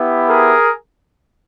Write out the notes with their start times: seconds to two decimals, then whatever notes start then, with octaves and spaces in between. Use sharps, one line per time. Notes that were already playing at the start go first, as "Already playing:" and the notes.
Already playing: B3 E4 G4
0.28 G#4 A#4